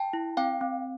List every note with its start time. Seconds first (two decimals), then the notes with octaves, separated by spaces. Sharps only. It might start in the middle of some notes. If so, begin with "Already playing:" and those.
Already playing: G5 A5
0.13 E4
0.37 C4 F5 G5
0.61 C4